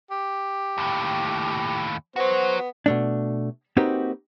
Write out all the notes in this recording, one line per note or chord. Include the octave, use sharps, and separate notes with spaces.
G4
D#2 A2
B3 F#4 C5 C#5
B2 A3 D4
A#3 C4 D#4 F#4 G4 B4